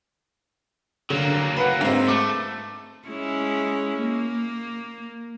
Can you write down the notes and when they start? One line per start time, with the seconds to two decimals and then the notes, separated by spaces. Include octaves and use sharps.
1.10 D3 F#3 A#3
1.56 B4 F#5
1.81 G#2 C4
2.08 A3 D6
3.08 G#3 C#4 E4
3.99 A#3